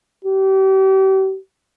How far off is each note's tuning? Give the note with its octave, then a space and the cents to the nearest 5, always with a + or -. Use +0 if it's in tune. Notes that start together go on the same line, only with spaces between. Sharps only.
G4 -35